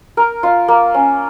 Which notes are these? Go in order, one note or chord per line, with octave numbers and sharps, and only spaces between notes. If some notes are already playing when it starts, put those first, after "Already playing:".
A#4
F4
A#3
C#4